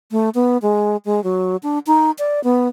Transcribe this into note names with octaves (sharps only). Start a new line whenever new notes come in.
A3
B3
G#3
G#3
F#3
D4
D#4
D5
B3